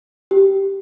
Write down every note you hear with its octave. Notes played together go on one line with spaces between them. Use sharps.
G4